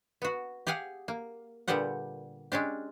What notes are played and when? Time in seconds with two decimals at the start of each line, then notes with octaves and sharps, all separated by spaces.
0.22 B3 F#4
0.67 G4 G#4 F5 F#5 G#5
1.08 A#3
1.68 A#2 D3 G3 B3 G4 F#5
2.52 G#3 C#4 D4 G4